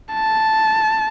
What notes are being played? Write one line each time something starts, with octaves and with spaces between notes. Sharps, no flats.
A5